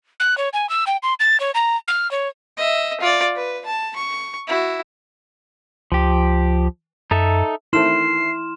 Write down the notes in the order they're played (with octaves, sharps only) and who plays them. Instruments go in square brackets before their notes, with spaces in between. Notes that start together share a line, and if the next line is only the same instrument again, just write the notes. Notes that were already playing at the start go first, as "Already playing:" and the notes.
[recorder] F#6
C#5
G#5
E6
G5
C6
A6
C#5
A#5
F6
C#5
[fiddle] D#5 E5
F4 D5
B4
A5
C#6
E4 F#4
[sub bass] C#2 [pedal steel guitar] F3 G4
[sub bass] F#2 [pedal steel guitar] D#4 A4 E5
[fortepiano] D#3 A3 C4 [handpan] E4 [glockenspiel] C6 F6 E7 [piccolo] C7